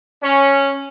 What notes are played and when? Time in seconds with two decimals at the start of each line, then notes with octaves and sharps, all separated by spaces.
0.23 C#4